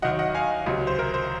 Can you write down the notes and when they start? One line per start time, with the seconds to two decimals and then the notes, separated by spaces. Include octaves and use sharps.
0.02 D#2 D#3 F#3 D#5 F#5
0.19 D#5 F#5
0.35 F5 G#5
0.66 C#2 C3 F#3
0.87 C5
0.99 A#4
1.14 C5